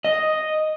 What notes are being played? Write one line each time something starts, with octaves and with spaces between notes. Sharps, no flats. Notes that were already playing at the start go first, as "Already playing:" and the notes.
D#5